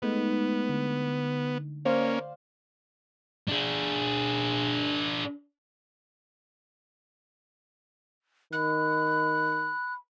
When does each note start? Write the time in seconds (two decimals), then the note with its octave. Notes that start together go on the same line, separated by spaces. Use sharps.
0.02 G#3 A3 B3 D#4
0.69 D3
1.85 A#3 C#4 C5 D5 F5
3.48 D4 G#4
8.53 D#3 B5 F#6